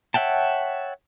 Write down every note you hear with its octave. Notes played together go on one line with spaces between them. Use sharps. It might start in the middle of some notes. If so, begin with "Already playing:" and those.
C#5 E5 F#5 G5 A5